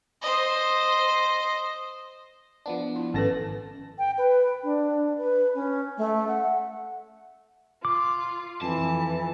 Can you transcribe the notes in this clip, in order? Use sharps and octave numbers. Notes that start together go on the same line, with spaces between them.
C5 D#5
F3 B3 D4
E4
G#1 C#4 A4 B4 A5 A#6
G5
B4
D4
B4
C#4
A3
F#5
F4 D6
F2 E3 A5